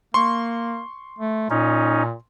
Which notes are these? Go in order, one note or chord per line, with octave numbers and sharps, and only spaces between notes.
A#3 C6 C#6
A3
A#2 C#4 D#4